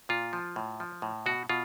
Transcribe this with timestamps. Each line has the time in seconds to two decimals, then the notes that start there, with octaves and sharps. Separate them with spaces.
0.09 A#2 F4
0.33 F3
0.56 A2
0.80 F3
1.02 A2
1.26 B2 F#4
1.49 B2 F4